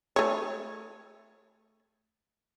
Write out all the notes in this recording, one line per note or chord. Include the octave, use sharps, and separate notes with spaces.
A3 C#5